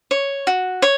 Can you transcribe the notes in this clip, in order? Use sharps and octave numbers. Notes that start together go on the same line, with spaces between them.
C#5
F#4
C#5